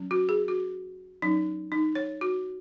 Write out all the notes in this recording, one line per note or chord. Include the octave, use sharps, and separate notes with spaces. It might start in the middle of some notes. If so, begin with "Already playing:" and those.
Already playing: F#3 C#4
F#4
G#4
F#4
F#3 C#4 D#4
D#4
C#5
F#4